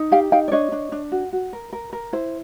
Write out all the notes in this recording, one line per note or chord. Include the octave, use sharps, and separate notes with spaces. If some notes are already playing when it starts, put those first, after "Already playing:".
Already playing: D#4
G4 F5 G5
D#4 F5 G5
D5
D4 C#5 D#5
D4
D4
F#4
F#4
A#4
A#4
A#4
E4 C5